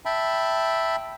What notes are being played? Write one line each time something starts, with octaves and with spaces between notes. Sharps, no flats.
E5 G5 A5 B5